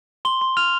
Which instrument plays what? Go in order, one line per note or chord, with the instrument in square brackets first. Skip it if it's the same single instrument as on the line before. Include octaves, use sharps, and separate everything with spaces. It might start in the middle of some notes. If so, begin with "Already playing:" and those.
[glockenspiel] C6 G7
C6
F6 F7